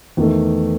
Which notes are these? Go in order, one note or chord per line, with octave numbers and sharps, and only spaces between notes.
E2 D#3 A3